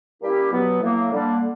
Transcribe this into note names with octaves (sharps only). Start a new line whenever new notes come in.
G3 A#3 C#4 E4 G4
B2 F#3 B3
A2 F#3 A#3
D3 G3 A#3 D4